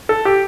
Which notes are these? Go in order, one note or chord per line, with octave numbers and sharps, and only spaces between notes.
A4
G4